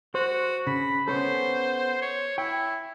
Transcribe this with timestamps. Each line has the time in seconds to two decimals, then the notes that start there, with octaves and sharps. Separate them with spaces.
0.15 F#4 C5
0.67 C#3 B5
1.08 B3 C#4 A4 C5
2.02 C#5
2.38 E4 G5